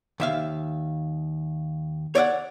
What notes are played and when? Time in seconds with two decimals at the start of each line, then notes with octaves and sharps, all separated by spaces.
0.20 D#2 E5 F5
2.15 C#5 D5 E5 F#5